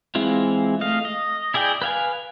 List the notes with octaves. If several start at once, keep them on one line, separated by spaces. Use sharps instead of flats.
E3 G#3 C4 E4 F4
A3 D#5 F5
D#5
E4 G#4 D5 G5
B4 F5 G#5